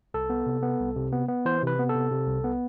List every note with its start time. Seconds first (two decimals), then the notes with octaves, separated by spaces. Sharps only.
0.14 C2 A4
0.30 B3
0.46 C3
0.63 B3
0.80 C2
0.96 C3
1.12 B3
1.28 B3
1.45 E3 C5
1.63 C3 B4
1.79 B3
1.89 A4
1.95 C3
2.11 C3
2.27 C2
2.44 B3